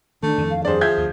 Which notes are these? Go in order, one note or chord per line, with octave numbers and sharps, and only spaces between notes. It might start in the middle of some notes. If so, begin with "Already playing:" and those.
D#3 A3 D4
F2 D#3 E3
F5
G2 G#4 C5 D5
F3 E5 G6 G#6
D2